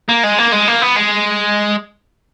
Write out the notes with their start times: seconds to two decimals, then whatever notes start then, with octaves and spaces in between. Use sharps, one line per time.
0.09 A#3
0.23 G#3
0.38 A#3
0.52 G#3
0.68 A#3
0.82 B3
0.96 G#3